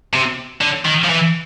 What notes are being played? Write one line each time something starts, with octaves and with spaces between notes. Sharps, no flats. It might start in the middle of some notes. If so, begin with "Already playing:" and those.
C3
D3
D#3
F3
E3